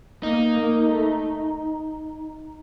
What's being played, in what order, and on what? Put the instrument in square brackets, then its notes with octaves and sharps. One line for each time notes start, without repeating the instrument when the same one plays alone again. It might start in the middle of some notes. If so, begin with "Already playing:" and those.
[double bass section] A#3 [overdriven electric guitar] D#4
[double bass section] A#3
A3